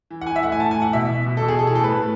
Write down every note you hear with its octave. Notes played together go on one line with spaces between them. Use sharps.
E3
F#5
E3 G#5
E5
A2 F#5
G#5
A2 A5
G#5
E3 F#5
B2 E5
B2
B2
A4
B2
G#4
E3 A4
G#4
A2 A4
B4
A2